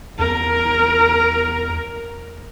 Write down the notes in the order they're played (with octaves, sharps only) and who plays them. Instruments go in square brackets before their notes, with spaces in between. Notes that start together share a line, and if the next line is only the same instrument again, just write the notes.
[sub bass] E2 [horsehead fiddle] A#4